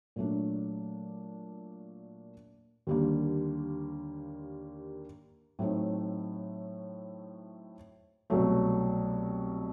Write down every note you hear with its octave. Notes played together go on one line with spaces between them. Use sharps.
A#2 F#3 A3 D4
D#2 D3 G3 A#3
A2 F#3 A3 C4 D#4
C2 B2 F#3 A3